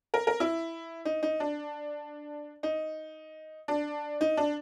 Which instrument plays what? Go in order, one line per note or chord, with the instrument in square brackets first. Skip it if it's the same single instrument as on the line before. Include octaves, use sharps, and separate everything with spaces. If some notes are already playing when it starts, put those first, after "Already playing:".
[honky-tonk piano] A#4
A#4
E4
D#4
D#4
D4
D#4
D4
D#4
D4